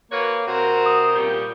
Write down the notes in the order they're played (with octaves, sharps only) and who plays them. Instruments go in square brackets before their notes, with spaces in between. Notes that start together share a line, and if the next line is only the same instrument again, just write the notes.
[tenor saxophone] A#3 [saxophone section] F#4 B4 C#5
[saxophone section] C3 C5 [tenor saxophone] F#4 [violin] A#4
[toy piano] D#6
[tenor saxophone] A#2 [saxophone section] G3 C#4 G4